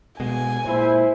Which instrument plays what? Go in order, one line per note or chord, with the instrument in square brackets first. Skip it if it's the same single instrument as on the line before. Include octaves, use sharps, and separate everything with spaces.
[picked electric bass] B2 G#3 [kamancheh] G#5
[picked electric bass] A#2 G#3 [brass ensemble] E4 C5